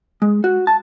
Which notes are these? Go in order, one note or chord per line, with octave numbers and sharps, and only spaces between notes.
G#3
F#4
A5